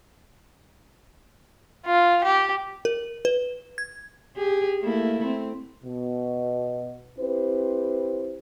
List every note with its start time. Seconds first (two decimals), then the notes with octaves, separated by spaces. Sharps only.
1.86 F4
2.24 G4
2.85 A#4
3.25 B4
3.78 G#6
4.37 G4 G#4
4.81 A3 A#3 E4
5.25 C4
5.83 B2
7.19 C4 E4 G4 B4 C5